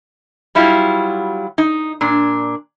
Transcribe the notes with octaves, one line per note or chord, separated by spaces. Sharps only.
F#3 G3 E4 F4
D#4
A#2 D4